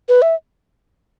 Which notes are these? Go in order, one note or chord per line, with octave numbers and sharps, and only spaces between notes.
B4
E5